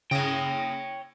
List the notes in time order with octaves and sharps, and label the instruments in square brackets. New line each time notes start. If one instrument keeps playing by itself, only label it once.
[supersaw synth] C#3 D#6 A#6 [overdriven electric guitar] C#5 G5